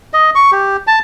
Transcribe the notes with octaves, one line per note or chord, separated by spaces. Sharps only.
D#5
C#6
G4
A5